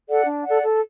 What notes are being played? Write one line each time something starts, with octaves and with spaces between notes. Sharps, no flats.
A4 D5 F#5
D4
A4 D5 F#5
A4